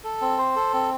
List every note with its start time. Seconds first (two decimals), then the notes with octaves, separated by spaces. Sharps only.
0.04 A4
0.21 C4
0.38 C5
0.56 A4
0.73 C4